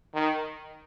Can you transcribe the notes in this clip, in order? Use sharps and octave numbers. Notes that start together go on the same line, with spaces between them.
D#3